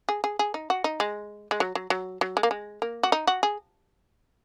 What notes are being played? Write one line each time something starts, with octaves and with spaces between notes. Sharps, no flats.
G#4
G#4
G#4
D#4
F#4
D#4
G#3
G#3
F#3
F#3
F#3
F#3
G#3
A#3
G#3
A#3
F#4
D#4
F#4
G#4